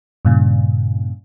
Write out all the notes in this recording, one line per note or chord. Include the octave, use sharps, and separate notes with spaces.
G2 A#2 C#3